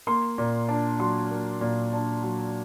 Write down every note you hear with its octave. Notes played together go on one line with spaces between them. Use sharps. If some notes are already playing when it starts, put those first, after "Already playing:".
A#3 C6
A#2
D4
F#3 C6
A#3
A#2
D4
F#3